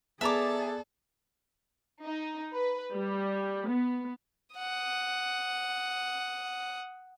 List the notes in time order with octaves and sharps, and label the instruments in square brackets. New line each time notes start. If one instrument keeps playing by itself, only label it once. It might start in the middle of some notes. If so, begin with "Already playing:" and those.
[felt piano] B3 A5 [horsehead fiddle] G#4 [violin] A4 D5 [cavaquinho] E5 A#5 D6
[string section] D#4
B4
G3
B3
[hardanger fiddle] F#5 D#6